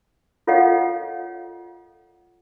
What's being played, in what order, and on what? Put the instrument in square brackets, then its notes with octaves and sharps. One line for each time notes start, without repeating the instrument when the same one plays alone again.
[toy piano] F4 A4 C#5 D#5 F5 F#5